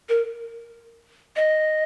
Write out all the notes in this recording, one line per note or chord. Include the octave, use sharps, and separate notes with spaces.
A#4
D#5